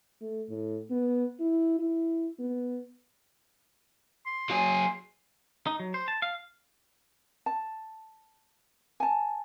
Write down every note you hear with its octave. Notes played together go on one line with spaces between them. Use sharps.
A3
A2
B3
E4
E4
B3
C6
F#3 G#4
D#4
F#3
C5
A5
F5
A5
G#5 A5